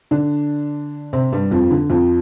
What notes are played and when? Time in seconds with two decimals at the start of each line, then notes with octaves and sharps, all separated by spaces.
0.11 D3 D4
1.13 C3 C4
1.32 G2 G3
1.51 F2 F3
1.71 D3
1.90 F2 F3